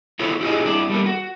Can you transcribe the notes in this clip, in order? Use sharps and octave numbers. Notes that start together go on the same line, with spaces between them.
E4 F4 A4 C5 C#5
E4 F4 G4 G#4 D#5
C4 D4 E4
G3 A3 A#3
F#4